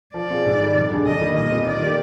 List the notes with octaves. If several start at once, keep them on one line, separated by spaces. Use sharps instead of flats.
F3 D5
C4 F4 G#4
G#2
D#3 G3
F2
D3 G3 D4 G#4
F2 D#5
D#3 G3 A#3
A#2 D#5
G3 C4
D#3 D5
A#3 D#4 G4